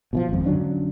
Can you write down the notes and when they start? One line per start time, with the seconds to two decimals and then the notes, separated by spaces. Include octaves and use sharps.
0.13 B2 E3 F3
0.29 G#1 F2
0.46 D3 F#3 C#4 D4